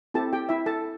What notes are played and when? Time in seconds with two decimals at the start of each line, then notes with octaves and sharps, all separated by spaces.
0.14 C4 E4 G4 A4 A5
0.33 G4 G5
0.49 E4 E5
0.66 A4 A5